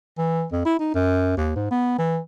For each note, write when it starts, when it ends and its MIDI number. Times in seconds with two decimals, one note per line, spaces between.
0.18 0.45 52
0.52 0.62 41
0.65 0.76 64
0.79 0.93 63
0.94 1.37 42
1.37 1.55 39
1.56 1.66 44
1.71 1.97 59
1.98 2.19 52